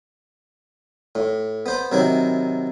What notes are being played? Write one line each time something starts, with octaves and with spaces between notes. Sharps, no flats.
A2
B3 C5 B5
C3 D#3 F#3 E4 B5